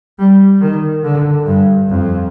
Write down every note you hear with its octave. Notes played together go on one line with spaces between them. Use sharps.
G3
D#3
D3
G2
F2